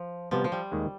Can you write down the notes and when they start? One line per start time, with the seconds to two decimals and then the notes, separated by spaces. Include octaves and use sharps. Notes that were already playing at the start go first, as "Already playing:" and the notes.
Already playing: F3
0.31 C3 F3 G3 B3
0.44 F3
0.52 G3
0.72 D#2 D#3 G#3